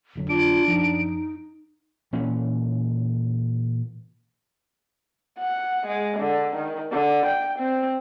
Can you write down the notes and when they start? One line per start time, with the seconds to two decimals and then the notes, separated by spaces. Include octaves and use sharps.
0.15 F1 D3 F#3
0.29 D4 F4 D7
0.68 F#2 F3 D#4
2.13 A#2 E3 C#4
5.39 F#5
5.87 G#3
6.20 D3
6.56 D#3
6.92 D3
7.26 G5
7.59 C4